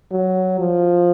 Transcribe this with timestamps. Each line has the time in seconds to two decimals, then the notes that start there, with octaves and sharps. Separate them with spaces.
0.12 F#3
0.59 F3